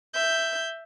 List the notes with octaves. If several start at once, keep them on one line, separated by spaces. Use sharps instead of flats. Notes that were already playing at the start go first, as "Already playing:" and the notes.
E5 G6